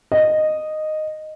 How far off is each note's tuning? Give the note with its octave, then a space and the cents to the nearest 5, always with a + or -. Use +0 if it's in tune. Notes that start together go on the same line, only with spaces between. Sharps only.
D#5 -10